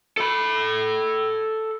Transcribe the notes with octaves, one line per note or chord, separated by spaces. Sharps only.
A4 B5